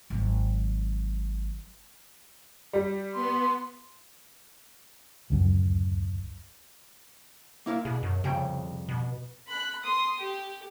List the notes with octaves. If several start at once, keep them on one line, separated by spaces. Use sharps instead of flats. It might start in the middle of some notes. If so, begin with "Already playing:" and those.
G#1 F#3
G3
B3 C6
D1 C#2 F#2
A#3 E4 F5
B2 G#4
F#2
C2 F2 C#3 G5
B2
B5 F#6
C6 D#6
G4